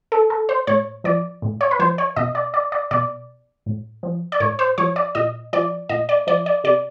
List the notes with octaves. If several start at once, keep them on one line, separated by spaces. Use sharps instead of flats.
A4
A4
C5
A2 C#5
F3 D5
A2
C#5
B4
F3 C5
C#5
B2 D#5
D5
D5
D5
B2 D5
A2
F3
D5
A2 C#5
C5
F3 C#5
D5
A#2 D#5
F3 D5
A#2 D#5
D5
F3 D5
D5
C3 D5